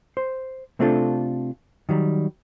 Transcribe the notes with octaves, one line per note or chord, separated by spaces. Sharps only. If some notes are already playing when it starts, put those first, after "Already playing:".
C5
C3 A3 C4 D4 F4 A4
D#3 F#3 G3